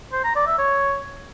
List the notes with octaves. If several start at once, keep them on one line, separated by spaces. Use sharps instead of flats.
C5
A#5
D5
E5
C#5